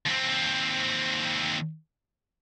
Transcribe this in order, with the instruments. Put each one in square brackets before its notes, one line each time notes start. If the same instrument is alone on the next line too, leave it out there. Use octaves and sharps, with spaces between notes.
[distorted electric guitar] D#2 C4